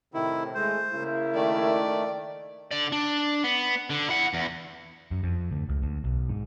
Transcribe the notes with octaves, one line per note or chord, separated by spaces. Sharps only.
A2 C3 D#3 E4
G#3 A3 C5
C#3 A#3 E4
D#3 A3 D5
D3 D5
D4
B3
D3
E4 F#5
E2
F#2
F2
D2
C#2
D2
B1
G#2